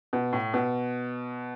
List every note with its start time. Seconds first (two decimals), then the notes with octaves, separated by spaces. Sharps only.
0.13 B2
0.33 A2
0.54 B2